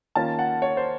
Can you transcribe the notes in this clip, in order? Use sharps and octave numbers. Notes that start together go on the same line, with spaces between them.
D#3 A#3 C#4 F4 A5
F#5
C#5
C5